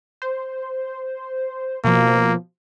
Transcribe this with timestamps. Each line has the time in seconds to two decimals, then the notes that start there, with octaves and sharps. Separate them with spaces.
0.22 C5
1.84 B2 F3 A#3